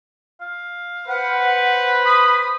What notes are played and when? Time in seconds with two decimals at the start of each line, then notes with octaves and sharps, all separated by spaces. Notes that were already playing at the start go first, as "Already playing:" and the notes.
0.41 F5
1.08 B4 C5 F#5
2.05 B5 D#6